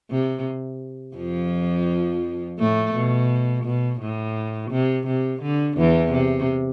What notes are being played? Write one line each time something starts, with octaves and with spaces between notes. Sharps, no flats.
C3
F2 F3
A2 A3
B2
B2
A2
C3
C3
D3
E2 E3
C3